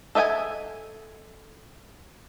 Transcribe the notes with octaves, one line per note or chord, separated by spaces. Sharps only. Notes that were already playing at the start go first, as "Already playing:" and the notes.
A4 D#5 E5 G5 G#5